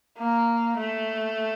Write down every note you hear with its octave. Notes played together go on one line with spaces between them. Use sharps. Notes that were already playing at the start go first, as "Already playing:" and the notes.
A#3
A3